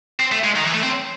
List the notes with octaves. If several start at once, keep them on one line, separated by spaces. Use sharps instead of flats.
C4
A3
G#3
D#3
E3
A3
C4